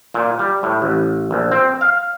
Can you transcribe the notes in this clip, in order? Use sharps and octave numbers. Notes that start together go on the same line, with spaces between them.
A#2
G3
A2
A1
A#1
C4
F5